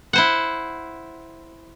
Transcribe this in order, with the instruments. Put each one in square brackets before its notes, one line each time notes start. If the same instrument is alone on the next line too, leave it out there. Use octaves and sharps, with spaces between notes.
[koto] E4 C5 F#5